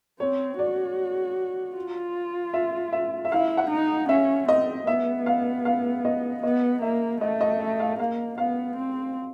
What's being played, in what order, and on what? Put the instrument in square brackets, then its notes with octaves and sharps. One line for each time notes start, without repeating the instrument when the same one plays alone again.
[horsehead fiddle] C4 [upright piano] C#5
[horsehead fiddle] F#4 [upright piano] D5
[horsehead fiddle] F4
[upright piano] E5
E5
E5
[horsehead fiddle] E4 [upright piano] F5
[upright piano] F#5
[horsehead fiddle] D#4
[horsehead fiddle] C#4 [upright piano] E5
[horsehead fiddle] C4 [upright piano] D#5
[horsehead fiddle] B3 [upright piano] E5
[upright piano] F5
F5
D#5
[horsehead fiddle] B3 [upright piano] D#5
[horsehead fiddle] A#3 [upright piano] E5
[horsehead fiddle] A3 [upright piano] D#5
[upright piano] D#5
E5
F5
[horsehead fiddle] A#3 [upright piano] F5
[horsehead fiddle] B3 [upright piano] F5
[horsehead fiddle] C4